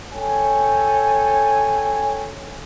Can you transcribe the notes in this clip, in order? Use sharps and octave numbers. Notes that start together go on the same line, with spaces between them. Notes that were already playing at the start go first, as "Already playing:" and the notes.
A4 C#5 G5 G#5